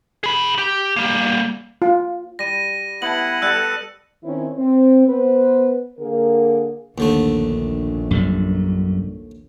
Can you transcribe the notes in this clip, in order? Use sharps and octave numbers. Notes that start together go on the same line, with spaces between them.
G#4 B5
G4
G3 A#3
F4
G3 A#6 D#7
B3 E4 F#5 A5 F#7
G3 A4 E6 F#6 C#7
D#3 C4 C#4 E4
C4
B3 B4 C5
D3 A#3 G#4 A#4
A#1 D#2 D3 A3
F#2 C3 G3